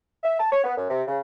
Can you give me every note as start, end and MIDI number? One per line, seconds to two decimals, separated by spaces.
0.24 0.38 76
0.40 0.51 81
0.52 0.64 73
0.64 0.74 59
0.77 0.89 42
0.89 1.02 48
1.08 1.19 49